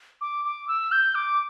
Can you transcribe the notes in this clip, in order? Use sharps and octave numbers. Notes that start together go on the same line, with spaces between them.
D6
D6
E6
G6
D6